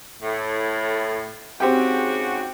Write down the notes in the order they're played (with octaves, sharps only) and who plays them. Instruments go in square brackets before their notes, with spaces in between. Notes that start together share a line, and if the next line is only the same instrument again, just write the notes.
[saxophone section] A2
[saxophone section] G#2 C#3 F#4 [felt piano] C4 G4 G5